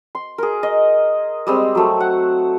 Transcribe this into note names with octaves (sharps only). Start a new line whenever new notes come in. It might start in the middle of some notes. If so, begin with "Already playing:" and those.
C6
G#4 A#4
D#5
G3 G#3 C4
F#3 A3
F#5